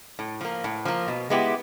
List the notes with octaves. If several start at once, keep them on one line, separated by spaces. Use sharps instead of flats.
A2
F3 A#3
A2
F3 A#3
B2
G#3 B3 E4 G4